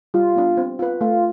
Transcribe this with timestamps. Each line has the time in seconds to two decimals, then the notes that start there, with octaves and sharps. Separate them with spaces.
0.14 G3 F4
0.36 B3 D4
0.57 C4
0.79 F4 B4
1.01 A3 F4